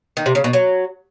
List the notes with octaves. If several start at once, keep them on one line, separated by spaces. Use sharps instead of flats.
D#3
C3
C#3
B2
F#3